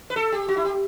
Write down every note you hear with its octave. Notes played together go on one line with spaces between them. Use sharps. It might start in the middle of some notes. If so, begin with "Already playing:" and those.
B4
A4
G4
F#4
E4
G4